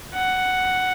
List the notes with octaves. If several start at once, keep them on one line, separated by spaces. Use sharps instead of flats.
F#5